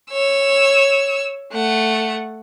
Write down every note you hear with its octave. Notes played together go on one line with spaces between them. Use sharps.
C#5 E6
A3 F#5